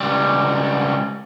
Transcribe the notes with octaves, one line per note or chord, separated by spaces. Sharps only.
C#2 G3